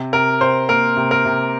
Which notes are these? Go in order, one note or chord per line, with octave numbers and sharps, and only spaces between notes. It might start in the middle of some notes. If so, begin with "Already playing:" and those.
Already playing: C3
C3 A#4
C3 C5
A#3 A#4
C3
A#4
C3